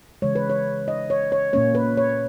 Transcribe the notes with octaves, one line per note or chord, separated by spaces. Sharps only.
C#3 E3 G#3 C#5
B4
C#5
D#5
C#5
C#5
A#2 A#3 C#4 C#5
B4
C#5